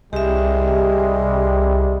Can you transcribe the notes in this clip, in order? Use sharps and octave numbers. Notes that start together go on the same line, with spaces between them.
C2 G3 G#3 G4 E5